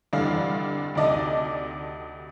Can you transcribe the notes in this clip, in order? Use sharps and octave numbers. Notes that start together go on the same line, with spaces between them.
F1 G2 D3 E3 D4 F5
D2 C3 D#4 D5 D#5 A5